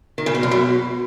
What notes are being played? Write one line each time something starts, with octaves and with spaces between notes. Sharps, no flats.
D#3
C#3
B2
F#2
B2